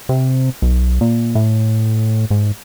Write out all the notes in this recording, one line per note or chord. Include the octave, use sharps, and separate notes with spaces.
C3
B1
A#2
A2
G#2